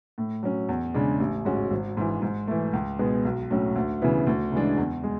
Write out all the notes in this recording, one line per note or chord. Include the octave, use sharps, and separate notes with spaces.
A2
F#3 C#4
E2
C#3 G#3 D4
A1
G#2 G#3 C#4 F#4
G#1
G#2 E3
G#2
E3 A3
C#2
B2 G#3 B3
B1
A2 F#3 C#4
D2
C#3 E3 B3 E4
D2
C#3 E3 G#3 D4
E2
G#3